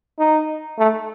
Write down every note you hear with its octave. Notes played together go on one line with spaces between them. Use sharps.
D#4
A3